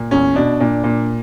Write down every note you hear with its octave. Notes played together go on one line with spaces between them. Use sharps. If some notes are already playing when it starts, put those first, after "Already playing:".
Already playing: A#2
E2 C#4
B2 D4
A#2 D4
A#2